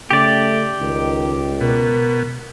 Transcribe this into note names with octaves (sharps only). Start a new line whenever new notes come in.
C#3 A3 G4 D5
C#2 D#3
B2 A#4